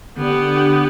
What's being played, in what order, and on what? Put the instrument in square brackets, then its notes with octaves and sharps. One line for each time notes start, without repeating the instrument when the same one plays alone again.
[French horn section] D3 [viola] B3 G4